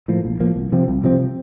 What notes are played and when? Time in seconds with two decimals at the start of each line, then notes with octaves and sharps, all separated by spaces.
0.08 A2 F3 A#3
0.25 A#1
0.40 A2 F3 A#3
0.56 C2
0.72 C3 F3 C4
0.88 C2
1.04 C3 F3 C4